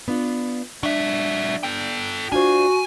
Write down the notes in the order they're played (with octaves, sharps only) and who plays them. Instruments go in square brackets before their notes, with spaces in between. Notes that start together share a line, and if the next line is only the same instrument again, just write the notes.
[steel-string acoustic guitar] B3 D4 F4
[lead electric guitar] F#3 E5 [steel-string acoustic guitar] D4
[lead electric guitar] A4 G5
[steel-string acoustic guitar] D4 F4 C5 [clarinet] F#4 [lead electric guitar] G#5